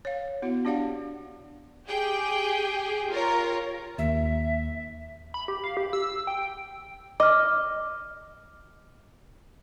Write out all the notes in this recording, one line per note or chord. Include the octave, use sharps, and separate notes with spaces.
C#5 F5
B3 E4 F#4
D4 G4 D5 F5 F#5
G4 G#4 G5
F4 A#4 C#5
D#2 E5
B5
G4
F5
G4
E6
G5
D#5 D6 F6